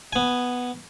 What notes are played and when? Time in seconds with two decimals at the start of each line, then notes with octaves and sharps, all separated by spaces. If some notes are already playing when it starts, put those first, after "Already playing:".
0.13 B3 G#5